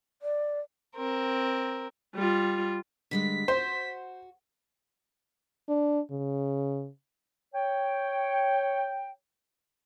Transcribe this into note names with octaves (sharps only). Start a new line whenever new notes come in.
D5
C4 A#4
G3 F4
D3 G3 G#3 B6
F#4 C5
D4
C#3
C#5 G5